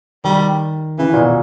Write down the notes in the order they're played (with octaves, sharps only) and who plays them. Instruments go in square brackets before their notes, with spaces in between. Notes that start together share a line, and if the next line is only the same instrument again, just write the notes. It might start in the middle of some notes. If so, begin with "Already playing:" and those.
[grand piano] D#3 [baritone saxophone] G3
[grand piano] C#3 [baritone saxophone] E3
[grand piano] A#2
B2